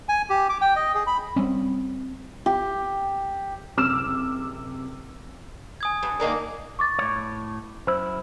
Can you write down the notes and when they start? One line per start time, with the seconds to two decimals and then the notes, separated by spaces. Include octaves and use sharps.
0.09 G#5
0.30 G4
0.49 D6
0.61 G5
0.76 D#5
0.95 G#4
1.07 B5
1.36 G3 C4 C#4
2.46 G4
3.77 F#1 C3 D6 E6 F6 E7
5.81 G#5 D#6 G#6
6.03 G2
6.20 D#3 A#3 D4
6.79 C#6 D6 A6
6.99 A2 C#5
7.87 F#2 E4 C5 E6